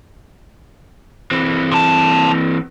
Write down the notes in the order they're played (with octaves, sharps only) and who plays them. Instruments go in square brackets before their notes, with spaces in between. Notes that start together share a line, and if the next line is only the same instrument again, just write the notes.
[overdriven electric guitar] E3 C4
[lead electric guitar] C3 A5